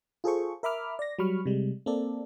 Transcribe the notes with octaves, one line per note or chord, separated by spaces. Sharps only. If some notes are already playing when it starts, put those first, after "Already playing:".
F4 G#4 A4 C5 C#6
A#4 E5 B5 D6 F6
D5 A#6
F#3 G3 B5 C#6 F6
C3 G3 G#3
A#3 C4 A4 D5